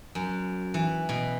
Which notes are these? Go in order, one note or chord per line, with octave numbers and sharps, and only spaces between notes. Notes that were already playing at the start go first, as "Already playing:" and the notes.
F#2
E3
B2